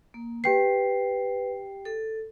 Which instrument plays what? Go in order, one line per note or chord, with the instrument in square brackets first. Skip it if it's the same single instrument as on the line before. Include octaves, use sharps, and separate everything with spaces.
[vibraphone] A#3
[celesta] G4 G5 C7 [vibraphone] B4
[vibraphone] A4